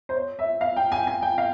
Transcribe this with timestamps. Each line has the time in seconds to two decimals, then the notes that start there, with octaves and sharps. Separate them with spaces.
0.09 C5
0.15 C#5
0.39 E5
0.61 F5
0.77 G5
0.92 G#5
1.07 G#5
1.22 G5
1.38 F5